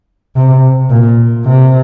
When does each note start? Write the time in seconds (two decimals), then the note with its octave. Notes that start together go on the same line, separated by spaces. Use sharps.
0.36 C3
0.90 A#2
1.46 C3